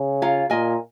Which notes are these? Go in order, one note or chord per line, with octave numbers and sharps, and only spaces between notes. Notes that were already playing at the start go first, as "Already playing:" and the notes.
Already playing: C#3
F4 C#5 F5 A#5
A#2 A#4 D#5 G#5